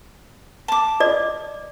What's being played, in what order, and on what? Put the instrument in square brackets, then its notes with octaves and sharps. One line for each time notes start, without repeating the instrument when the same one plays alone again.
[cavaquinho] A5 D6
[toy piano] D5 D#5